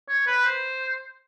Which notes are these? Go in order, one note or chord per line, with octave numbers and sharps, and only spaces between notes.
C#5
B4
C5